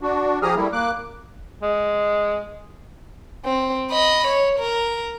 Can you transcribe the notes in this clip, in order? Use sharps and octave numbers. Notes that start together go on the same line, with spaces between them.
D4 F#4
F3 G4 G#4 A#5 D#6 F6
G3 A3 A#3 E4
A#3 D6 F#6
G#3
C4
D#5 B5
C#5
A#4